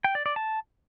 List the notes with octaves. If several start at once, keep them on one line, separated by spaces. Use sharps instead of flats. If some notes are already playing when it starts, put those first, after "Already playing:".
G5
D5
D5
A5